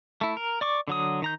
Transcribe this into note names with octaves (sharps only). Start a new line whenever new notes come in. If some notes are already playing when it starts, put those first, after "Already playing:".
A3 E4
A#4
D5 C#6 D6
D3 F#3 D#6
D#3 A#5 G6